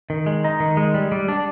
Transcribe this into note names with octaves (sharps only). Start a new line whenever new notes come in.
D#3
G#3
D#4
D#3
G#3
G3
G3
D4